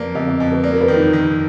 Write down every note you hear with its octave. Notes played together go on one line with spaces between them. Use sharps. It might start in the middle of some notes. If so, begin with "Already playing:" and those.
Already playing: F2 A#3 B4 D5
F2 D#5
D#5
F2
B4
A#3 D5
A#4
B4
D#3
D#4
D#3